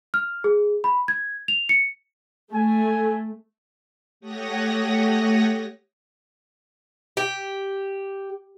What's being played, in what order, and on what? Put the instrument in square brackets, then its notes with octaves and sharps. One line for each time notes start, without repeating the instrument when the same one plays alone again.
[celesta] F6
G#4
B5
G#6
F7
C#7
[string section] A3 [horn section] G#5
[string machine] A3 G4 C#5 F#5 D#6 A#6
[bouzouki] G4